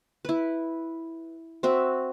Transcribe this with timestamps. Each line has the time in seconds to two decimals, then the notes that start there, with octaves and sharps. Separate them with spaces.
0.25 E4 B4
1.63 C4 F#4 E5